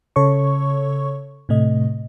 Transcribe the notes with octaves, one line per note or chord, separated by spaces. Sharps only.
C#3 A4 C#5 C#6
A2 C3 A3 D#5